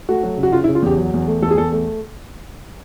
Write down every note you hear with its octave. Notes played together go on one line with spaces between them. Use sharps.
A3 F#4
F#3
C#3
F#4
C#3 F4
E4
C#3
F4
E2 G4
F#3
E2
A3
E2 A4
G#4
E2 A4
A3